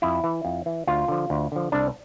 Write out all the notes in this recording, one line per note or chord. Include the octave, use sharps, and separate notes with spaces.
F2 E4
E3
F2
E3
D2 F4
D3 F3
D2
D3 F3
C2 D4